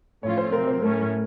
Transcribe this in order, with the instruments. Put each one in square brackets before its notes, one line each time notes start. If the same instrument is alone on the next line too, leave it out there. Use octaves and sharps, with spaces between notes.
[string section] A2 F3 A3 C#4 F4 [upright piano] C#5
[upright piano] C5
[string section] C3 F#3 C4 [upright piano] A#4
[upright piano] C5
[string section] A2 A3 C#4 [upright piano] A#4